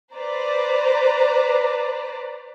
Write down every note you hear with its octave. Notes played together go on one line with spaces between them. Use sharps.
B4 C5 D5 A#5